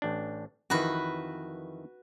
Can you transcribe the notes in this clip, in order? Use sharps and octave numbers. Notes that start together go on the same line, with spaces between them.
A1 D4
F2 D#3 E3 F#4 B4